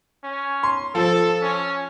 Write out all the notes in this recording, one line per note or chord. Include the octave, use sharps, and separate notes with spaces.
C#4
C6
F3 A4
C#4